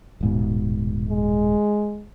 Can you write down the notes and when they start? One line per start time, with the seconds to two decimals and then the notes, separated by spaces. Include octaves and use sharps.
0.21 D#1 G#2 B2
1.09 G#3